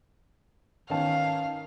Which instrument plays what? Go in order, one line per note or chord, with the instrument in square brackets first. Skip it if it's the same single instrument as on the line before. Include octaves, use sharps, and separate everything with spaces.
[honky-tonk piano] D#3 A5 [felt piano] C#4 B4 G5 [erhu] F5